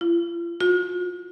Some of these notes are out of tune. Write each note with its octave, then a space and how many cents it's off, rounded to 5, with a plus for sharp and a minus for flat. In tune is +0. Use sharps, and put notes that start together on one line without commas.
F4 -40
F4 +45